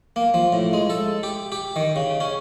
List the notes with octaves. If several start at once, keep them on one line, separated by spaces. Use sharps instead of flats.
A#3
F3
A2
G#3
A4
G4
G4
D#3
C#3
C#4